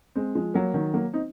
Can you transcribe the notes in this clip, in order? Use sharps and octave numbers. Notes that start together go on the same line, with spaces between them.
G#3 C4
F3 G#3
F#3 A#3
D#3 F#3
F#3 A#3
C4 D#4